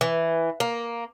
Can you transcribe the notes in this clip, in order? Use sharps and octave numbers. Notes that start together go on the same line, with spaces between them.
E3
A#3